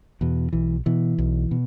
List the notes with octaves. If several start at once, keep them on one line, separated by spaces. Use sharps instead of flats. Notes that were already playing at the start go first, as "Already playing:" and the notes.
E2 B2
B1 E3
B2 E3
B1
B2